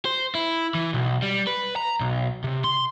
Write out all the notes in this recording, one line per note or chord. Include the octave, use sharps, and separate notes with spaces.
C5
E4
E3
B1
G3
B4
A#5
B1
C3
C6